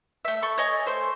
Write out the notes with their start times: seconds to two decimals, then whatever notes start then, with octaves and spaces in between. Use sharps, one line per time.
0.25 A3 E5
0.42 A4 B5 C#6
0.58 C#5 D#5 G#5
0.87 A3 C5